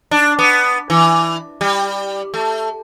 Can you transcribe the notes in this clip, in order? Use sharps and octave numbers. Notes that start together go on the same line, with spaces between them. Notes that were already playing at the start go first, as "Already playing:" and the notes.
D4
B3
E3
G3
A3